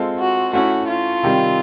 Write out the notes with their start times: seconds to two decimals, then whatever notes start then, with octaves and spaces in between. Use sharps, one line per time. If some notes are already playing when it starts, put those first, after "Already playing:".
Already playing: G#3 C4 F4 A4
0.19 F#4
0.53 A3 C#4 E4 F#4
0.88 F4
1.23 C3 D#3 G3